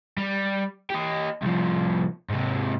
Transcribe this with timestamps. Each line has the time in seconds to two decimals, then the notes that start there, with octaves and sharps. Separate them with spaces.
0.18 G3
0.90 G4 D#5
1.42 C2 F3
2.29 G#2 C3